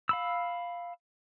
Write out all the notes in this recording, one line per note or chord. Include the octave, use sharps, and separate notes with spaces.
F5 B5 E6